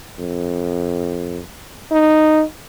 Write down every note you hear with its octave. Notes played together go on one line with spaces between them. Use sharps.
F2
D#4